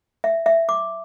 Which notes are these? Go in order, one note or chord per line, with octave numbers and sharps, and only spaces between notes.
E5
E5
D6